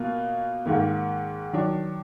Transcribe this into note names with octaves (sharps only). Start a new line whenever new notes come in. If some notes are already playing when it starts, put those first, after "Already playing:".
Already playing: B2 A#3 F4
G#2 D#3 A#3
D#3 F#3 D4